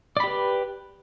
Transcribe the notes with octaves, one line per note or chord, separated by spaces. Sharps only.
G4 B4 D5 B5